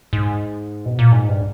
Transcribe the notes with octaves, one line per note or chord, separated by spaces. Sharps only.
G#2
B2
A#2
G#2
G2